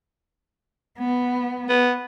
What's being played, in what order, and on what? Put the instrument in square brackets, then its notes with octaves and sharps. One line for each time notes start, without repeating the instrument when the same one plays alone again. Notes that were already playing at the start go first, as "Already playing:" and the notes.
[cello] B3
[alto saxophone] B3